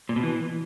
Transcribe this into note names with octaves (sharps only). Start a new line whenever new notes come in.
A#2
B2
E3